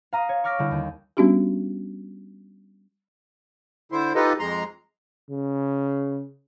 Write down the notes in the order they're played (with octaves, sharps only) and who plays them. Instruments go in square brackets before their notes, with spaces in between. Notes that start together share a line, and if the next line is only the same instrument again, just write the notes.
[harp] F5 A#5 D#6
C#5
C#6 D6 F6 A#6 B6 D7
D3 G3 E4
D#2
[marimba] G3 B3 C#4 D4 F#4 G4
[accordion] D3 E4 C5
D#4 F4 G4 A4 B4 D#5
F2 G#3 A#5 C6
[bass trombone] C#3